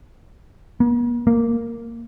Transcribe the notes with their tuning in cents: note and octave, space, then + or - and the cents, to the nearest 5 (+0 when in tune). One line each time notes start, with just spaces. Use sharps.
A#3 +45
A#3 -5